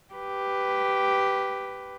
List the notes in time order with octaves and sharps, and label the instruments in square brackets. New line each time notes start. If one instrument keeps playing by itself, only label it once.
[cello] G4 B4